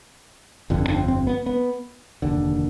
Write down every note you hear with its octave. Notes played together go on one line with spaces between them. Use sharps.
G1 F2 D3
D4
C4
C4
B3
B3
F1 D#2 D3